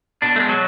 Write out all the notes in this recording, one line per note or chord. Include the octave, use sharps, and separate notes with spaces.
B2 D4
A3
G#3
F#3